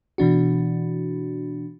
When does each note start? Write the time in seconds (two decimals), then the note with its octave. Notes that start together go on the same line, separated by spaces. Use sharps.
0.18 B2 E3 D4 F#4